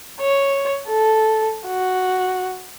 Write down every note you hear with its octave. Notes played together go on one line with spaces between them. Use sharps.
C#5
A4
F#4